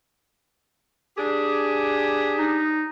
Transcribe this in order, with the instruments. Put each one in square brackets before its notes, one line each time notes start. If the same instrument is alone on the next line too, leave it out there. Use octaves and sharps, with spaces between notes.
[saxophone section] D4 G4 G#4
[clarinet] D#4